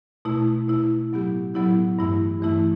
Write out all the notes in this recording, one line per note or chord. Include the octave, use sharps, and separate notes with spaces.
B2 A3 E4
B2 A3 E4
A2 F#3 B3 E4 G4
A2 F#3 B3 E4 G4
G2 E3 A3 E4
G2 E3 A3 E4